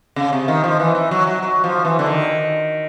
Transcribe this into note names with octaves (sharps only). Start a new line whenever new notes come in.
C#3
C3
D#3
F3
E3
E3
F#3
F#3
F#3
F3
E3
D3
D#3